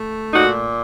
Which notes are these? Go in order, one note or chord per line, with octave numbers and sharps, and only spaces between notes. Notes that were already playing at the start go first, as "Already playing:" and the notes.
Already playing: A3
A#2 D#4 F#4